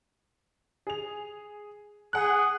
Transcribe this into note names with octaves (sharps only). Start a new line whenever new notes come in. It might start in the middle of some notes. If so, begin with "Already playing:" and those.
G#4 F7
G#4 F#5 D#6 F#6